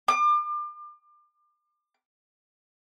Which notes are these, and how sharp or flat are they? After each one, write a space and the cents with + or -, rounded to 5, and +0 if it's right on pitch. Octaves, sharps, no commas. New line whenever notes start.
D6 +35